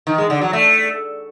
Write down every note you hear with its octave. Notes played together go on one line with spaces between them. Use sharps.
D#3
G#3
D3
F#3
A3